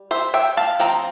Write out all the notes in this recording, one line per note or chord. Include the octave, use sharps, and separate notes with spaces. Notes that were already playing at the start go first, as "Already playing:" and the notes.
Already playing: G3
C5 E5
E5 G5
F5 A5
F3 C4 G5 A#5